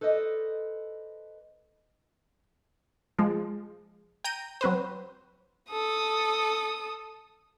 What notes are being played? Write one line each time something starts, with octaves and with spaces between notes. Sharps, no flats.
A4 B4 C5 D5 D#5
F3 G#3
G5 A#5 G6 D#7
F#3 C4 B4 C5
A4 D#6